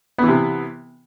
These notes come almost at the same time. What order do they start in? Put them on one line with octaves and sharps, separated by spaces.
B3 E3 C3